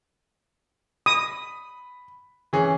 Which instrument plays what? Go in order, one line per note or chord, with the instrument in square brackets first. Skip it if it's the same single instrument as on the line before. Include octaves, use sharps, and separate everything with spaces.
[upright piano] B5 [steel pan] D#6
[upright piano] E3 C#4 G#4